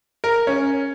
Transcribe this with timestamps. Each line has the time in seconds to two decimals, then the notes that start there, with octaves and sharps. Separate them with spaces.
0.24 A#4
0.47 C#4